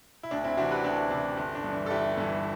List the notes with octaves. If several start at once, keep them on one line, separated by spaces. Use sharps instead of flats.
E4
D2 D4
C4 E4
C3 E3 D4 F#4
G4 B4
D2 D4 F#4
C3 E3 D4
G1 D4
D4
G2 E3
D4
A4
G1 E4 G4
G2 E3